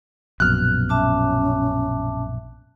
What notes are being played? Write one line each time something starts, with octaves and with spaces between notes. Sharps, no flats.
A#1 F#2 B2 F6 F#6
C#4 E5 A5 D6